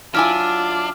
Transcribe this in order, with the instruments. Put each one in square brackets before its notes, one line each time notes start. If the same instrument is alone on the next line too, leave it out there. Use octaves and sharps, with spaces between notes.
[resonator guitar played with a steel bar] F#3 E4 G#5 [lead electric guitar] D4 [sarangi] F4 [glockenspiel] D6 F6